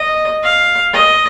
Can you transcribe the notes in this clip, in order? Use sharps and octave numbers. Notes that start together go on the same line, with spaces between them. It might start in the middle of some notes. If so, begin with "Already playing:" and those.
Already playing: D#5
F5
D#5